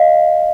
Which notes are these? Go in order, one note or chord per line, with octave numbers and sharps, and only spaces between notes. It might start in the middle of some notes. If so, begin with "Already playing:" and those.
Already playing: D#5 F5